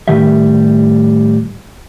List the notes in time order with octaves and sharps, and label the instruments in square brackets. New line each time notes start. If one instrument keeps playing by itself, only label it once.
[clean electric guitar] A2 D#3 G3 G4 E5